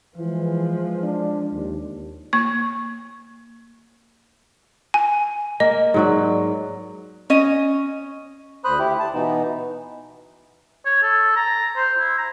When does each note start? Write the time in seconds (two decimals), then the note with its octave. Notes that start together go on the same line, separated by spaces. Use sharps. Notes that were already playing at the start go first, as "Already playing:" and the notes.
0.17 E3 F3 G#3
1.03 D4
1.54 D#2
2.33 A#3 C#6
4.94 G#5
5.60 A#3 D#5
5.94 G#2 F#3 D5
7.30 C#4 D#5
8.65 D2 C5 B5 D#6 F#6
8.79 E4 G4
8.99 A5
9.14 B2 E3 B3 D#4
10.86 C#5
11.02 A4
11.36 A#5
11.76 C5
11.98 E4
12.18 A#5